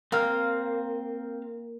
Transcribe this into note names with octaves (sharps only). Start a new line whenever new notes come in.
A#3 C4 F5 F6